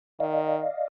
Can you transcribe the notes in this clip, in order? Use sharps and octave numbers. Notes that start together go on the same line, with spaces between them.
D#3 D5 D#5 F5